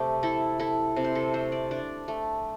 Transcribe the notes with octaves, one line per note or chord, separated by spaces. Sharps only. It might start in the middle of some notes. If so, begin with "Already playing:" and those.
Already playing: C3 A3 G4
E4 A4
E4 A4
C3
C5
A4
A3 C5
D5
D4 D5
A3